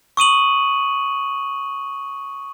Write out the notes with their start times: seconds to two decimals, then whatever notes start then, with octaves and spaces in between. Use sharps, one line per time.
0.17 C#6 D#6 D#7 F#7